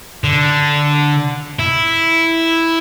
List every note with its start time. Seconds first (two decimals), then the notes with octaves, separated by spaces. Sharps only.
0.24 D3
1.59 E4